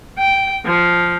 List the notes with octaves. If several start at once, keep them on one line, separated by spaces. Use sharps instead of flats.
G5
F3